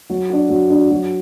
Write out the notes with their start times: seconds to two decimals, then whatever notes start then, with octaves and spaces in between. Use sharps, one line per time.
0.10 F#3
0.30 D4 F#4
0.49 F#3
0.70 D4 F#4
0.90 F#3